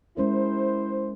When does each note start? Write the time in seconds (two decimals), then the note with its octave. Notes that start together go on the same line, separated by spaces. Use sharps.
0.17 G#3 C#4 E4 A#4 C5